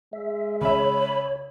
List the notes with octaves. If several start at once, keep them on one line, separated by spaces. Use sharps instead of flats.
G#3 E5
C#3 C#5 E5 B5